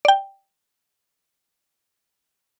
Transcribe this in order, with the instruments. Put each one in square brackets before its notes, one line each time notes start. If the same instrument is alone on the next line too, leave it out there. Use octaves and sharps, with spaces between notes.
[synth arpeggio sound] D5 G5